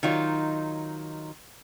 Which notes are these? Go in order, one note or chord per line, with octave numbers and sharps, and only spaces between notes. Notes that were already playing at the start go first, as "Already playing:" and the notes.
D#3 F#3 D#4 F4